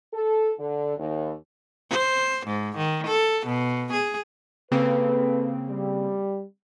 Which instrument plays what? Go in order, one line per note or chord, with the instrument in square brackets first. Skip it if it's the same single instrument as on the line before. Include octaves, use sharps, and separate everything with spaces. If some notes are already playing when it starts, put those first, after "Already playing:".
[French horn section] A4
D3
D#2
[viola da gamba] C5
G#2
D#3
A4
B2
G#4
[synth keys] C#3 A#3 C4 [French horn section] A4 B4
[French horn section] G3